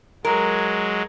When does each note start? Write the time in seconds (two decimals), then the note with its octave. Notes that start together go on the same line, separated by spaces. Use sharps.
0.25 F#3 G#3 A#4